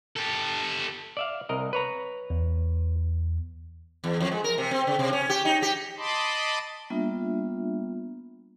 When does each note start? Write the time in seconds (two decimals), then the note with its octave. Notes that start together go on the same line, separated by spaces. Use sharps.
0.16 G4 A4
1.17 D5 E5 F5
1.49 C2 A#4 D#5
1.73 B4 C#5 A#5
2.30 E2
4.04 E2
4.20 F2
4.32 G#3
4.44 A#4
4.58 C3
4.71 C4
4.87 C#3
4.99 C3
5.13 C#4
5.29 G4
5.45 D#4
5.62 G4
5.97 D#5 A5 B5 C6 D6
6.90 G3 A#3 B3 D4 F4 E5